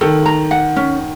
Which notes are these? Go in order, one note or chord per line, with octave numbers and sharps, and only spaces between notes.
D#3 A4
A#5
F#5
C#4